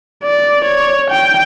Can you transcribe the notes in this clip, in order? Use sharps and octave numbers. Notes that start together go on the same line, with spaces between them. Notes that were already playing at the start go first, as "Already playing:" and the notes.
D5
C#5
G5